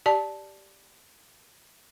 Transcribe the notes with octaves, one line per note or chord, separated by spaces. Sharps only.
G4 D5 A5